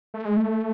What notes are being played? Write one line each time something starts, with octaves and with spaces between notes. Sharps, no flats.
A3
G#3
A3